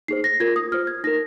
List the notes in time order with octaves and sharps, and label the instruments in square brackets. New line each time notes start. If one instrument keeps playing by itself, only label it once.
[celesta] D#4 G#4 C5 C7
A#6
F4 A#4 G#6
D#6
F4 C5 F6
G#6
D#4 A#4 A#6